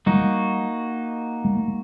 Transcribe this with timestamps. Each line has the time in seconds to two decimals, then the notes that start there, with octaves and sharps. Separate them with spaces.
0.06 G3 A#3 D#4 F#4
0.14 G#3
0.21 G3
1.45 G#3
1.57 A3
1.68 G#3